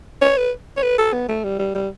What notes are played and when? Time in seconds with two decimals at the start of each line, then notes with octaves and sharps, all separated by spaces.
0.21 C#5
0.37 B4
0.77 C#5
0.82 B4
0.98 A4
1.13 B3
1.28 A3
1.44 G3
1.59 G3
1.74 G3